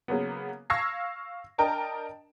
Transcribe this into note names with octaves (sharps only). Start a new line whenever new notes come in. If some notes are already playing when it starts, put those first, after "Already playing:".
C#3 F#3 A#3 B3
F5 C#6 E6 G#6 A#6 C7
D4 A#4 D#5 G5 A5 A#5